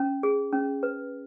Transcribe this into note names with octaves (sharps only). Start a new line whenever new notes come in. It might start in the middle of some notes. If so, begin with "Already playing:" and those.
Already playing: C#4
G#4
C#4
B4